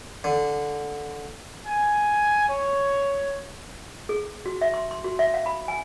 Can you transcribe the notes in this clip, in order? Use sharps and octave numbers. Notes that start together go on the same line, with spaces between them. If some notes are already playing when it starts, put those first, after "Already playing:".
D3
G#5
C#5
G#4
F#4
E5
C6
C6
F#4
E5
F5
B5
G#5